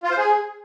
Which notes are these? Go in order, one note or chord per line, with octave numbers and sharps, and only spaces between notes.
F4
C5
G#4